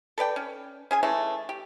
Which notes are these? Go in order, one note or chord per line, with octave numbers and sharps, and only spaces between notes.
A4 B4 D5 G5
C#4
C#4 G#4 G#5
E3 G#3 A3 C#4
G4